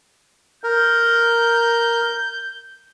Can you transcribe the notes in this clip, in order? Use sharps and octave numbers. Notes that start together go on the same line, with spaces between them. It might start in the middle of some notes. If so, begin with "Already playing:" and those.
A#4 G6